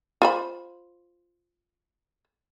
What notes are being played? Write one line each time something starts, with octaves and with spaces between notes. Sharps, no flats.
F4 C5 B5